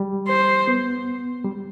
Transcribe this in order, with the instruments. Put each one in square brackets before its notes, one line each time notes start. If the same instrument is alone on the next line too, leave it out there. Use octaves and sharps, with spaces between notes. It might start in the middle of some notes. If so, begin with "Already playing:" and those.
Already playing: [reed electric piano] G3
[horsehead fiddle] C5
[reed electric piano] B3
G3